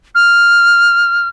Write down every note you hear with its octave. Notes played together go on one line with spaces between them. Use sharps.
F6